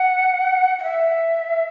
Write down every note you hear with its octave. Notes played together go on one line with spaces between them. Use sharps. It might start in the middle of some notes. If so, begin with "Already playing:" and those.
Already playing: F#5
F#5
E5